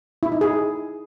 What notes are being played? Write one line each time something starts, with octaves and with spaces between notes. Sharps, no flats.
E4
D#4
G#4